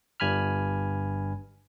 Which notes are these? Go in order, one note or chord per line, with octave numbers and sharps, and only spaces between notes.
G1 G2 G#5 B5 F6